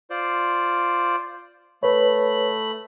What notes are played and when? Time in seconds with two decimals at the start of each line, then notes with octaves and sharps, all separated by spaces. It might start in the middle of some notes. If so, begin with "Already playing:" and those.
0.10 F4 C5 D5
1.83 A3 B4 C#5 B5